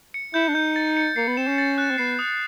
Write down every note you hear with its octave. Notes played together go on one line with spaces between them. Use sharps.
C#7
E4 G6
D4
D#4 G6
A6
C#7
A#3 C7
B3
C4 E7
C#4
A6
F#6
C4
B3 C7
D#6